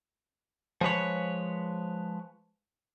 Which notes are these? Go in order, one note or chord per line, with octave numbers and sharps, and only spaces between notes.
F3 G#3 B4 C#5